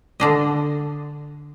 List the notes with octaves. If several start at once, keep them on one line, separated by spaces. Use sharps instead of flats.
D3 D4 D#5